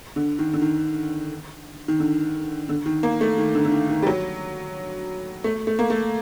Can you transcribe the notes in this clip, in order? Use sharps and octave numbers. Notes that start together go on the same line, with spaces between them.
D3
D#3
D3
D#3
D#3
D3
D3
D#3
A#3
A3
D#3
D3
D3
D#3
D#3
G3
F#3
A3
A3
A#3
A3